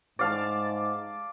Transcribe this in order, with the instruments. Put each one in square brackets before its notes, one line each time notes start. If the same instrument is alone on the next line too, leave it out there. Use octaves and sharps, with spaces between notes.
[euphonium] G#2 [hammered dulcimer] D5 F5 A5